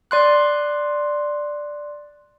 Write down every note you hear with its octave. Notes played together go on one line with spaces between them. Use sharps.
D5 C6 F#6